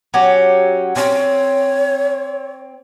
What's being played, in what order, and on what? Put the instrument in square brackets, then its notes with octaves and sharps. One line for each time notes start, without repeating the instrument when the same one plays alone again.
[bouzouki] F#3 C#4 G4
[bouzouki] C4 [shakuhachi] C#5